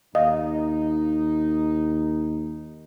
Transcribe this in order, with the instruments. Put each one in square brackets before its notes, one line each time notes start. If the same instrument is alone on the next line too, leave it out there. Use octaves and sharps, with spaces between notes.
[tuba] D#2 [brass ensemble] D#4 [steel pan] D#5 [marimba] F5